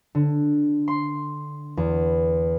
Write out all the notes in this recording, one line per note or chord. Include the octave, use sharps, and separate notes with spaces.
D3
C6
E2